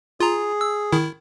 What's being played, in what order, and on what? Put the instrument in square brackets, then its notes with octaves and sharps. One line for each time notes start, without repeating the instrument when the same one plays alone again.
[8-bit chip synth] F4 A#5 [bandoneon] G#4
[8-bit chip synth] E6
D#3 E4